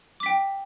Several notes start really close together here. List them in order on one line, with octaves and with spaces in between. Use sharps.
D6 B6 G5